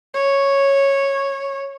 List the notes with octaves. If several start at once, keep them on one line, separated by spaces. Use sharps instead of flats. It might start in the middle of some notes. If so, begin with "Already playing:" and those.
C#5